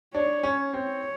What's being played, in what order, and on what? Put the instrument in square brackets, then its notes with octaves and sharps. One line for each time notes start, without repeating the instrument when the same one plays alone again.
[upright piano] D4 [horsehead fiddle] C#5
[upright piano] C#4
[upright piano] C4 [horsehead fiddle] C#5